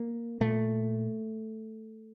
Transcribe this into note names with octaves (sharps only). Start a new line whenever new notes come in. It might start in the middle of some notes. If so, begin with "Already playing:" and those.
Already playing: A#3
A#2 A3